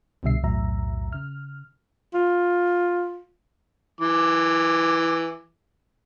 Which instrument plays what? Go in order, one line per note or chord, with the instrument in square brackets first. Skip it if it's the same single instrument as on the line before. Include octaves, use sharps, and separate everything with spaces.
[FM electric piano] C2 B2 D3 G3 E5 C7
B1 E2 A2 F#3 E5 A#5
C#3 F6
[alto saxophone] F4
[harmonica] E3 D6